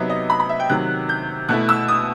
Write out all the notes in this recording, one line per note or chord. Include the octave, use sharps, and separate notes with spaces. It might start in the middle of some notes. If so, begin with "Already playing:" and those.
Already playing: C3 F#3 B3 D#4 E5
D#5
B5
B5
E5
G5
C3 D#3 F#3 F#6
G6
B2 A3 E4 F#6
E6
D#6